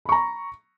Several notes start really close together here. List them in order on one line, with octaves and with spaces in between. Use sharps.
B5 C#6 A#5